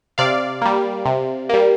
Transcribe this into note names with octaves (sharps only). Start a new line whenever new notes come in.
C3 D5 F5
G3 A#3
C3
G3 A#3